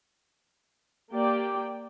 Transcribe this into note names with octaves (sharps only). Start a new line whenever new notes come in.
A#3 G4 D5 G5